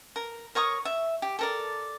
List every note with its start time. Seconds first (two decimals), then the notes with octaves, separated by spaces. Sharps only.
0.16 A#4
0.55 A#4 C#5 C#6 D#6
0.85 E5
1.22 G4
1.39 A4 A#4 D5